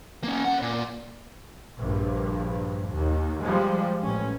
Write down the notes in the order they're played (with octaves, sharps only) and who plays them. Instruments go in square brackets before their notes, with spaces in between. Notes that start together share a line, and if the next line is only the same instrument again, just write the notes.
[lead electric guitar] A#3 C#4
C#4 F#5
A#2
[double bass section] A#1 G2
D#2
F3 G3 G#3
A1 C#4